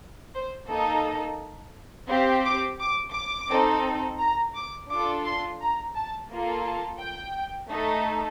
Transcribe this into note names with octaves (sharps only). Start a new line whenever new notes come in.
C5
A#3 D#4 A4 D#5
C4 G4 F5
D6
D6
D6
C4 D#4 A4
A#5
D6
D4 F4 A4 D6
C6
A#5
A5
A#3 F4 A4
A5
G5
A3 D#4 A4